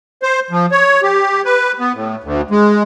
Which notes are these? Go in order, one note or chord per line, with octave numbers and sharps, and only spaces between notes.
C5
F3
C#5
G4
B4
B3
A2
D2
G#3